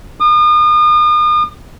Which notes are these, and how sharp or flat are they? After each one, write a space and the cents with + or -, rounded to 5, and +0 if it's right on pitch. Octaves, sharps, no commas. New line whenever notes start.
D#6 -40